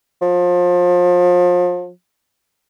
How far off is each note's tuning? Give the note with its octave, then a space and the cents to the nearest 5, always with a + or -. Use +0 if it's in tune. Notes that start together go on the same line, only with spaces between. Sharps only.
F3 +30